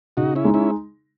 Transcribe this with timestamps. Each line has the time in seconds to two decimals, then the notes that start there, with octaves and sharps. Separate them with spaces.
0.17 C#3 D#4 F#4
0.35 C#4 E4
0.45 G#3 D#4
0.54 C#4 E4